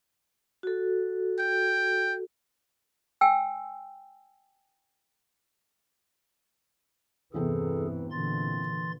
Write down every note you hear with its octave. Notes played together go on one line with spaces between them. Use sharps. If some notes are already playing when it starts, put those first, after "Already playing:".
F#4 A4
G5
G5 G#5 E6
E2 G2 C3 E3 C4 G#4 A4
A#2 D3 E3 C6 A6